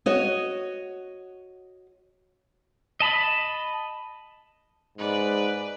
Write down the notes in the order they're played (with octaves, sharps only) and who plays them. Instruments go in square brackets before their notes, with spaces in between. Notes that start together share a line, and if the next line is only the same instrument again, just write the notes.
[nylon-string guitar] F#4 C#5 D#5
[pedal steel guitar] D#5 A5 B5
[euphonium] G#2 [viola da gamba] B4 D5